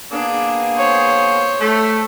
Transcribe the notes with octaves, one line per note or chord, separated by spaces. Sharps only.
A#3 B3 D4 G#4
C5 C#5
A3